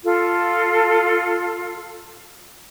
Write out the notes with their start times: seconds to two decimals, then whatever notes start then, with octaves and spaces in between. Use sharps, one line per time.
0.04 F4 A4